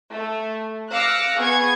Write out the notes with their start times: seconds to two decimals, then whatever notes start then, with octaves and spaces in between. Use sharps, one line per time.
0.11 A3
0.94 F5 D6 E6 F#6 A#6 C#7
1.40 B3 G#4 C#6 G#6